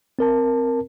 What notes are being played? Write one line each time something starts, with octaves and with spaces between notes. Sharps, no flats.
C4 A#4 A5